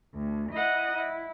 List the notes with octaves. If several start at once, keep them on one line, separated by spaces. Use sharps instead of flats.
D2
E4 D#5 F#5
E4